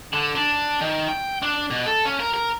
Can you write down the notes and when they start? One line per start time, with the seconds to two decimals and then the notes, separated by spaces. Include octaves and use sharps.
0.13 D3
0.35 D4
0.81 D#3
1.08 G5
1.43 D4
1.71 B2
1.86 A4
2.05 C#4
2.20 A#4
2.34 A#4